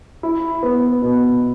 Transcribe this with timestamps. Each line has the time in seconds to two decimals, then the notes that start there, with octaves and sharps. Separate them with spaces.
0.23 E4
0.63 B3
1.02 B2